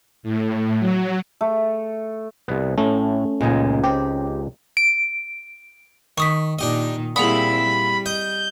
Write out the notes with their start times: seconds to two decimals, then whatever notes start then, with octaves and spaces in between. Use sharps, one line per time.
0.23 A2
0.79 F#3
1.41 A3
2.48 C2 B3
2.78 A2 A3 C#4
3.41 C#2 F#2 A#2 D#4 G#5
3.84 C4 G4
4.77 D7
6.18 D#3 C#6 D#6 B6
6.59 A#2 D#3 D4 D#4 G4 D#5
7.16 A#2 G3 C4 E4 G#4 F#5 B5 D#6
7.62 G3
8.06 D#5 G6